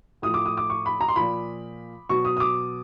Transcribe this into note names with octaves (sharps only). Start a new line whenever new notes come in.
A2 F3 D#6
D6
D#6
D6
C#6
B5
A#5
C6
A#2 F3 B5
B2 F#3 C#6
D#6
D#6
D6